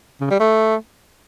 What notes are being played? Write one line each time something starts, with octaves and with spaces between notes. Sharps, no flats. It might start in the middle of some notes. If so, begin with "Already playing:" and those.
C#3
G3
A3